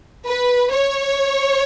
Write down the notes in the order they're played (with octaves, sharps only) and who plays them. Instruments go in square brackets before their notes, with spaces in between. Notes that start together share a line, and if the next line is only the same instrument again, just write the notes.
[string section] B4
C#5